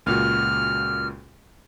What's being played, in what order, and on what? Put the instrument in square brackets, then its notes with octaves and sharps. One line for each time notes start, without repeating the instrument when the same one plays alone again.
[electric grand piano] C#2 A#2 F#4 [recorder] F6